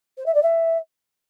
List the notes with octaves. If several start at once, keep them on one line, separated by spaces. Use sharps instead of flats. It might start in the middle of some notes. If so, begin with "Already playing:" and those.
C5
E5
D5
E5